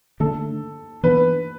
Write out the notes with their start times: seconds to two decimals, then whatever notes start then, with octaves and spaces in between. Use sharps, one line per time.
0.20 D3 A3 D4 A4
1.03 E3 B3 D4 B4